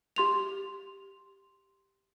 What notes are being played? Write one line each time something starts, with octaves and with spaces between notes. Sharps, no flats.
G4 C6 F7